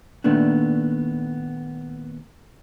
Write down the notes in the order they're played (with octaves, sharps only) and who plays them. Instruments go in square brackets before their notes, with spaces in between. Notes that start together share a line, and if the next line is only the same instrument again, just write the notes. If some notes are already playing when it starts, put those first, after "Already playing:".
[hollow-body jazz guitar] A#2 D#3 A3 B3 D4